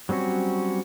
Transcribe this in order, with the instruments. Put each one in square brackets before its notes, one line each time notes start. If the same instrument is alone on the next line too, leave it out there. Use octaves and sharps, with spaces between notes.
[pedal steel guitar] F#3 G3 C4 C#4 F#4